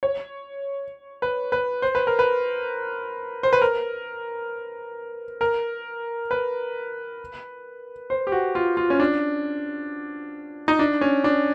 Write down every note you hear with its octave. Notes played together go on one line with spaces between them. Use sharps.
C#5
B4
B4
C5
B4
A#4
B4
C5
B4
A#4
A#4
B4
C5
G4
F#4
F4
F4
C#4
D4
D#4
D4
C#4
D4